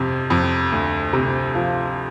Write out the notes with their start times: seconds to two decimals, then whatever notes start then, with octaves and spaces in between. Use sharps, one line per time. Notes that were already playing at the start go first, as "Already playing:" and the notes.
Already playing: F2 C3
0.30 F2
0.72 D2
1.13 C3
1.55 F3